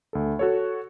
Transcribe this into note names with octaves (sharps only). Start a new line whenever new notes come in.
D2 A4
F#4 A4 C#5